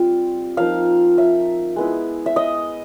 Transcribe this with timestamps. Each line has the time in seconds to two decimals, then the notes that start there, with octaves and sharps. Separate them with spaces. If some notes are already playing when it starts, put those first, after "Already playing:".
Already playing: G3 C4 F4
0.57 F3 A#3 D#4 F5
1.18 E5
1.76 G#3 B3 E4
2.26 E5
2.36 D#5